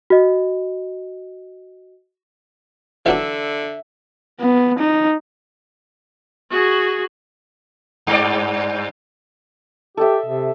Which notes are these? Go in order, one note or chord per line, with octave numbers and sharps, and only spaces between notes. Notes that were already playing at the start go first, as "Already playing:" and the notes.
F#4 D#5
D3 E3 F#3 D4 E5
B3
D#4
F#4 G#4
G2 D5
G4 A4 D#5 E5
C3